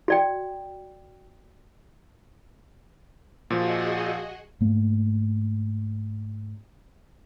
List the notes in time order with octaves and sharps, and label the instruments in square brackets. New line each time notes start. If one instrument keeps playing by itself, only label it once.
[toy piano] F#4 D5 G5
[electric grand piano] A#2 F3 [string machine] F#4 G#4 D#5
[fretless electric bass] G#2 A3 A#3